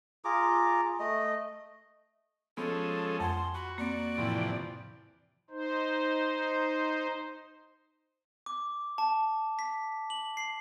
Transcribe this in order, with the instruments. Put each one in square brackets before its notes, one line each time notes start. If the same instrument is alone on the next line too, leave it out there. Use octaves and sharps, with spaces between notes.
[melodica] F4 G#4 A#5 D6
A3 D#5
[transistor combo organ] F3 G#3 C#4 [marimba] B3 [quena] A4
[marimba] F2 F#5 G#5 [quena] C6
[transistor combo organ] F#4 [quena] B5
[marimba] A#3 C4 [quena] D5
[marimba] A2 E4 [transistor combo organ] C3 E3 F3
[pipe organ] D#4 C5
[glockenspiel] D6
A5
B6
F#7
C7